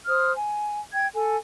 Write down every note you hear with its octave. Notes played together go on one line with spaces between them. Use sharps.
C5 D#6 F6
G#5
G5 G#6
A4 G#5